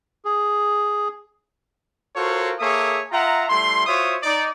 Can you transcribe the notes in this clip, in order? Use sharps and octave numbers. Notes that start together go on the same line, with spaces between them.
G#4
F4 F#4 A4 A#4 C5 C#5
A#3 G#4 A4 C#5 E5 D#6
F4 E5 F#5 A#5
G3 A3 E4 C6
F4 F#4 C5 C#5 E5 D#6
D#4 D5